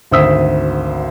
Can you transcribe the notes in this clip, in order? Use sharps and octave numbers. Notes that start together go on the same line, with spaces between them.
G#1 D2 C5 D#6 E6 B6